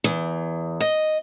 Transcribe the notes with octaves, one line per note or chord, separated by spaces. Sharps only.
E2
D#5